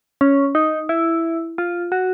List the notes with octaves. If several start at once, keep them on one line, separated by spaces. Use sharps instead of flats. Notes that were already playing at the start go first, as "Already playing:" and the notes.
C#4
D#4
E4
F4
F#4